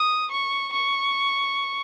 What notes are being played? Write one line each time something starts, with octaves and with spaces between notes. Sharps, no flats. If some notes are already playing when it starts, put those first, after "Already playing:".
Already playing: D#6
C#6
C#6